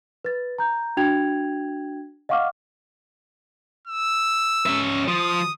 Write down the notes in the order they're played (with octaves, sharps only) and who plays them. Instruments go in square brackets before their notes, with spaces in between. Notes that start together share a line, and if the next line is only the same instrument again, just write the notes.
[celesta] B4 A6
A#5 G6
D4 F#4 G5 G#6 F7
D#5 F5 F#5 C#6 D6 F6
[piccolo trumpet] E6
[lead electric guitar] C#4 E5
[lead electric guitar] F3 [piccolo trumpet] D#6